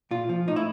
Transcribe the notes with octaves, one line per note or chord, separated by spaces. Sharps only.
A#2 F4
F3
A2 D#4
E4